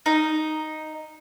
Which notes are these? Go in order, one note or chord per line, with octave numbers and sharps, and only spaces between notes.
D#4